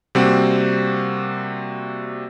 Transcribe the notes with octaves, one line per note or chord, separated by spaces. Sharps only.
C3 G3 A#3 C4 F#4